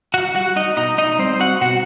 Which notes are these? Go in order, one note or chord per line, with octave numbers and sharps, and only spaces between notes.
F#4 F#5
G3 F#4 F#5
D#4 D#5
B2 D#4 D#5
D#4 D#5
G3 C4 C5
F#4 F#5
B2 F#4 F#5